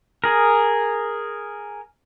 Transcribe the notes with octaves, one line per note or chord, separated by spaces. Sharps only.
G#4 A#4